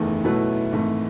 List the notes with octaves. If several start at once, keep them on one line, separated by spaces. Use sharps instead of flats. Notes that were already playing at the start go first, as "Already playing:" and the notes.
Already playing: F#1 E2 D#3 A3
B2 F#3 A3 E4 B4
G#1 G#2 E3 A3